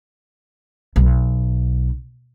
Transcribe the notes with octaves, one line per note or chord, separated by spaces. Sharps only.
B1